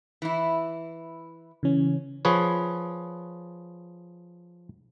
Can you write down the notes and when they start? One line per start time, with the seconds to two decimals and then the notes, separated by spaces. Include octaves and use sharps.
0.22 E3 E4
1.63 C#3 E3 C#4
2.25 F3 G#4 B4 C#5